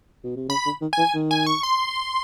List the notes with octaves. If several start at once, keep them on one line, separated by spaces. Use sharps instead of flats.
B2
C3
C#3 B5
D3
D#3
E3 G#5
D#3
G#5
C#6
C6